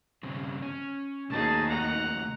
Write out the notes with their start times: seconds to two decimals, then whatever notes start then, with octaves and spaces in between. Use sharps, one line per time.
0.23 G2 C#3 C4
0.62 C#4
1.30 D#2 C3 A3 D#4 F#4 G#4 A5
1.68 F#5 A#5